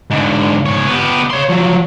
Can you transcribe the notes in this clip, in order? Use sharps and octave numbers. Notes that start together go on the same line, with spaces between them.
G#2 D3
G#2 C#5
B3 G4
C#5 C6
F3 F#3